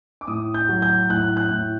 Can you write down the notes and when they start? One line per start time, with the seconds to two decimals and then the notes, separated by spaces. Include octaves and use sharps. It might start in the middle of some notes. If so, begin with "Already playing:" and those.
0.21 D6
0.27 A2 D#6
0.54 G6
0.69 F#3
0.82 G6
1.09 A2 F#6
1.37 F#6
1.51 A2